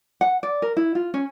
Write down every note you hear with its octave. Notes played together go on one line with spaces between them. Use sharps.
F#5
D5
A#4
E4
F4
C#4